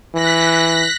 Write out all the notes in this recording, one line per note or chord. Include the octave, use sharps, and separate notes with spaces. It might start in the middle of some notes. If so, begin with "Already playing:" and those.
E3 F#6 A#6 B6